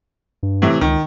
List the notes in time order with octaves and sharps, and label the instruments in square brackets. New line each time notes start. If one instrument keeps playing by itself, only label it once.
[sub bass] G2
[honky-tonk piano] A2 C3 E3
[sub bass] C#2 [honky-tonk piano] D#3